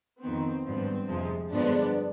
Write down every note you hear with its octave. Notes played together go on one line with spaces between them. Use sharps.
F2 D#3 B3 C4
G#1 G2 F3 B3 C4
F2 C3 F3 G#3
G2 D3 F3 G#3 B3 D4